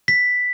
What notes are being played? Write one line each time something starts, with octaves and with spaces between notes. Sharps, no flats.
B6